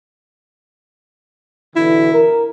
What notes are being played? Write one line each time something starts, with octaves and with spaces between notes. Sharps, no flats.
B2 D3 E3 E4
A#4